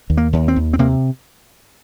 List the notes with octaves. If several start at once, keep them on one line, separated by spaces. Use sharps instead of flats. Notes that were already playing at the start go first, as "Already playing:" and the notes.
D#2
A#3
D#2
C4
D#2
C4
C3 A#3